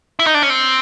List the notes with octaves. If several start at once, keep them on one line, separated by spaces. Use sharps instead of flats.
E4
D#4
D4
C#4
C4